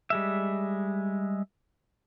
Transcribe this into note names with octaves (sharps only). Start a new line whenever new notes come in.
G3 G#3 E5